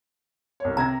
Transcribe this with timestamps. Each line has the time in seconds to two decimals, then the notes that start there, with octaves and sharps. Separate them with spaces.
0.60 C2 C#5
0.77 C3 A#5 G#6 A#6